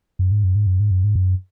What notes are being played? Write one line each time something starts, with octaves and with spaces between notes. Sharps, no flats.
F#2
G#2
F#2
G#2
F#2
G#2
F#2
G#2
F#2